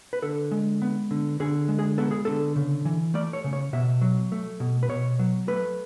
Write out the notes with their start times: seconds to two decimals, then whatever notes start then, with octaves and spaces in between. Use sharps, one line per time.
0.13 B4
0.22 D3 A4
0.51 G#3
0.82 B3
1.11 D3
1.40 D3 G#4
1.68 G#3
1.79 G#4
1.98 B3 A4
2.11 G#4
2.25 D3 A4
2.56 C#3
2.85 E3
3.14 A3 D5
3.33 C#5
3.44 C#3
3.53 C#5
3.73 B2 E5
4.01 F#3
4.32 A3
4.60 B2
4.83 B4
4.89 B2 C#5
5.19 F#3
5.48 A3 B4